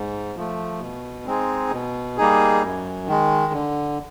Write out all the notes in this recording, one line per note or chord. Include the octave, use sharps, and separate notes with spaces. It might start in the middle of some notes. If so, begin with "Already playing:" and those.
Already playing: G#2
F3 A3
B2
G#3 C4 D#4 G#4
B2
G3 A#3 D#4 G#4
F#2
D#3 G#3
D3